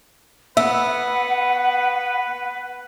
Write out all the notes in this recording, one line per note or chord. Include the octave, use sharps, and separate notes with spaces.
B3 B4 E5 F#5